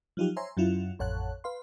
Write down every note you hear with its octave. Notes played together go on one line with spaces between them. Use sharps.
F3 F#3 D#4 F4 G4
C5 C#5 E5 G#5 A#5 C6
F#2 F#3 C#4 E4 F4
A1 F2 C#5 F#5 A5 F#6
B4 F5 C6